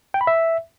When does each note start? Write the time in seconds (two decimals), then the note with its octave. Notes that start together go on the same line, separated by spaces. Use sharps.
0.14 G5
0.21 B5
0.27 E5